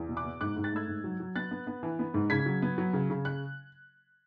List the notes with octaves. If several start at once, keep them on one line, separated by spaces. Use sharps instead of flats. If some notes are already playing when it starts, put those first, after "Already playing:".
Already playing: E2
B2
D6 F#6
B2
G#2 D6 F#6
G#2
F#6 A6
A3 E6 G#6
G#2
F#3
F#3
B3 F#6 A6
B3
B3
E3
B3
G#2
C#3 G#6 B6
F#3
B3
F#3
C#3
C#3
F#6